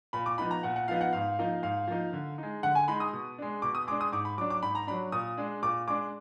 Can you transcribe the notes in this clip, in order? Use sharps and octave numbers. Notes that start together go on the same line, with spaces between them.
A#2 B5
D6
F3 B3 D#4 B5
A#5
A#2 F#5
F#5
F3 B3 D#4 F5
F#5
G#2 F5
F3 A#3 D#4
G#2 F5
F3 A#3 D#4
D3
G#3 D#4
D3 F#5
G#5
G#3 D#4 B5
D#6
B2
G#3 D4
B2 D6
D#6
G#3 D4 D6
D#6
G#2 D6
B5
F#3 D4 D6
D6
G#2 B5
A#5
F#3 D4 B5
A#2 D#6
G#3 D4
A#2 D6
G#3 D4 D6